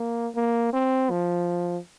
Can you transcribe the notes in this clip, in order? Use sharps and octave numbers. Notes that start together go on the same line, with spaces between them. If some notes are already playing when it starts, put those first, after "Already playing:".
Already playing: A#3
A#3
C4
F3